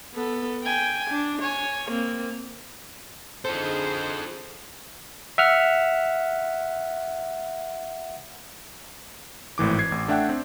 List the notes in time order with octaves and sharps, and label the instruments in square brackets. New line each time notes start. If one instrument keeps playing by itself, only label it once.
[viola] B3 A4
G5 G#5
D4
C#5 G#5
A#3 C4
[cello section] D3 D#4 G#4 [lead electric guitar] F4 A4 [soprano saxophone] C5
[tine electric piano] E5 F#5 F6
[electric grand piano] G#1 A2 E3 D6
G#6 C7
A1
A3 D4 E5 F#5 G5
C4